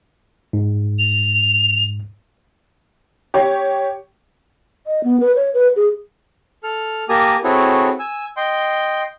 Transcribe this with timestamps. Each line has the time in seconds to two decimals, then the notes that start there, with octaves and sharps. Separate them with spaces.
0.53 G#2
0.99 F7
3.34 G4 C#5
4.86 D#5
5.04 B3
5.20 B4
5.36 C#5
5.54 B4
5.76 G#4
6.63 A4 F6
7.09 A#3 G4 A#4 G#5 A5 D#6
7.44 C4 E4 F#4 G#4 A4 C#5
7.99 G#5 E6
8.37 D#5 G5 C6